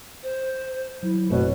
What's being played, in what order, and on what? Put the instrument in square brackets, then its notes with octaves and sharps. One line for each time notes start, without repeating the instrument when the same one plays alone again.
[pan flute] C5
[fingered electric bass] F#3 [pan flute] E4
[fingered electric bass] G1 F#2 [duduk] B2 [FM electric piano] A3 C4 C#5 [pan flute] B4